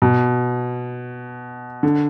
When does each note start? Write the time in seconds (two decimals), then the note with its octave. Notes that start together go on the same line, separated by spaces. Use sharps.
0.02 B2
1.83 D3